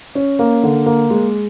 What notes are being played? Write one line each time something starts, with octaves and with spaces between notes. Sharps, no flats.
C#4
A#3
D3
A#3
G#3